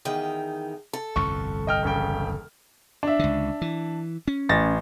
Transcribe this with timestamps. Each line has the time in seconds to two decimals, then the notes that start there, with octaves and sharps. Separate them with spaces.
0.05 E2 D#3 G5
0.93 A4
1.16 G1 C2 F2 C#6
1.67 D#5 G5 F6
1.83 E1 C#3 G5
3.03 D4 E5
3.19 C#2 D3
3.62 E3
4.28 C#4
4.49 A1 A6 A#6